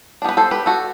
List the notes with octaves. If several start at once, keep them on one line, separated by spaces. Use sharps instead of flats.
D4
G3 B3 B4
A4 C5
G4 B4
F#4 A4